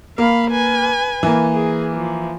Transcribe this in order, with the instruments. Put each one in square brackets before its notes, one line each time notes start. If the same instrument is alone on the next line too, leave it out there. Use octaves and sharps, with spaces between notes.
[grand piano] A#3 [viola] F5 B5
[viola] B4 G#5
[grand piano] E3 A#3
[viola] G#4
F3